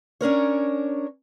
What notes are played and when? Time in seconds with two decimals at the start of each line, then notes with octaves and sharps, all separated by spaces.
0.21 C#4 D4 A#4 C#5